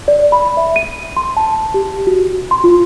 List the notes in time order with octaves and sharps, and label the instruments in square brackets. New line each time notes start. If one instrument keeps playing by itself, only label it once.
[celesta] D5
B5
E5
D#7
C6
A5
G4
F#4
C6
F4